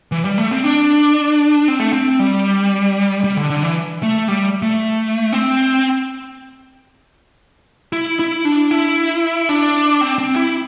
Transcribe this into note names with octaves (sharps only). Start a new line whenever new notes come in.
E3
G3
A3
C4
D4
C4
A3
C4
G3
G3
D3
D3
E3
A3
G3
A3
C4
E4
E4
D4
E4
D4
C4
C4
E4